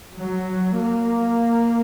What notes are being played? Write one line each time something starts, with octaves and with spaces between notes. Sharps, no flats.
F#3
A#3